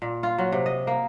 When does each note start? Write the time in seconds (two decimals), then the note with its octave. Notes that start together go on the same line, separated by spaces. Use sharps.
0.02 A#2
0.23 F4
0.38 F#3
0.52 C3
0.66 D#5
0.87 A#3